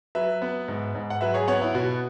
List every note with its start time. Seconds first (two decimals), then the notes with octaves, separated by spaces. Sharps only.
0.15 F#3 B4 E5
0.42 B3
0.68 G#2
0.95 G#2
1.10 F#5
1.21 F#3 B4 E5
1.34 G#4 C#5
1.48 B3 C#5 F#5
1.62 E4
1.74 B2 F#4